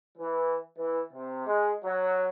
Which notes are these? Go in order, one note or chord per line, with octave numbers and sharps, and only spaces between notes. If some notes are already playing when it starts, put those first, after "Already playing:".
E3
E3
C3
G#3
F#3